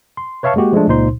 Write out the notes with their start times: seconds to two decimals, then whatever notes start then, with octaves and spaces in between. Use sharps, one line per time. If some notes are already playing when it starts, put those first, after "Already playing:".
0.17 C6
0.43 B4 C#5 E5 F5 A5 C#6
0.56 G#3 A#3 F#4 G4
0.73 F3 G#3 A3 D4
0.88 C#2 A#2 D#4 C5 C6